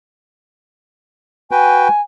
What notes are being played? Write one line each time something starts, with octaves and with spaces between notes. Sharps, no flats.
F#4 B4 G5 G#5